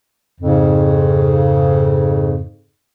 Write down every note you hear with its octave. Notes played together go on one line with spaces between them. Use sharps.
F2 G#2 C#3